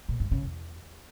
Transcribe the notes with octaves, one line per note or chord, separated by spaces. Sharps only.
A#2
G2
C#3
E2